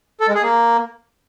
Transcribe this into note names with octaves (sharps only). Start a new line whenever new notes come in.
A4
G#3
G#4
A#3